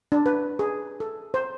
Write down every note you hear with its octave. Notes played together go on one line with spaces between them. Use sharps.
D4
B4
G#4
A4
C5